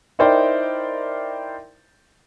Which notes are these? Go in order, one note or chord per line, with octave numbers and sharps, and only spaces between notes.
D#4 E4 A#4 C5 D5 G5